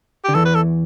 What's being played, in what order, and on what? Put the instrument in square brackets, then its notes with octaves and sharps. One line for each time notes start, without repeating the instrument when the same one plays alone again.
[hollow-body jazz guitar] D3 [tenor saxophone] G4
[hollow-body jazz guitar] E2 E3 [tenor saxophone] A4
[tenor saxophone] B4
A4